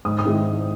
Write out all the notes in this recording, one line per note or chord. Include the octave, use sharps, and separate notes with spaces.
G#2 D#6
D#6
D#3 G#3 C4 E4